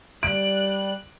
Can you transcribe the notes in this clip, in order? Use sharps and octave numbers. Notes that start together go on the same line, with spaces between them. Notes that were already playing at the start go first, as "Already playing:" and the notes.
G3 F#6 D7